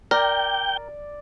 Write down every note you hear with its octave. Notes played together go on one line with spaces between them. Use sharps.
A#4 D5 G5